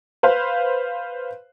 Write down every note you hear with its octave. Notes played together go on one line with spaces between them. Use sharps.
B4 C5 F5